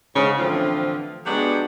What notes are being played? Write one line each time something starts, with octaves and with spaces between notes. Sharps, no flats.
G#2 C#3
A2 D3 E3 F3 C4 F4
F#3 G#3 B3 D4 F#4 G4